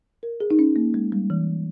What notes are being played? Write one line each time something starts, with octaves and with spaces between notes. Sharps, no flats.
A#4
G#4
D#4
C#4
A#3
G#3
G3
E3